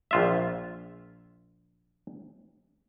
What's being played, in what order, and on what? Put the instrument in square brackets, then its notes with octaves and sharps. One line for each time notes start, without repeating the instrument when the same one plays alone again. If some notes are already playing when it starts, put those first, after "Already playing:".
[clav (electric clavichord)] A#1 F4 E5